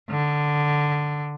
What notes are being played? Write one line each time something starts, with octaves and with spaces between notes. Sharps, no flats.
D3